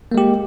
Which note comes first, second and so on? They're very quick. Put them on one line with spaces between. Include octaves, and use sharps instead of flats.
A#3 G#3 G4